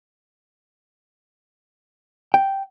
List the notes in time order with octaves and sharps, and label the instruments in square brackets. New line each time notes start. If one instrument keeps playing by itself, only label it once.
[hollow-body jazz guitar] G5